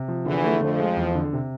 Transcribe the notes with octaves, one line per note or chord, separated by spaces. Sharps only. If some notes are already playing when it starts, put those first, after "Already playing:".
Already playing: C3
F3
E2 D3 E3
A3
F2 D3 F3
G#3
E2
D3
C3